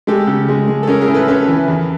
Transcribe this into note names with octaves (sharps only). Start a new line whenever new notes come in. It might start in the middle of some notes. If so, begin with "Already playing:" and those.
G#3 G4 A4
C#3
G#3
G#3
A4
C#4 G#4 A#4
G#4 A#4
A2
A4 B4
C#4 A4 B4
E3
E2